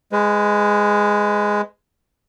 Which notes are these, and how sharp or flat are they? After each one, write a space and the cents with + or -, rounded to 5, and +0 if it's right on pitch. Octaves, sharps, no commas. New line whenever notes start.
G#3 +0 B4 +30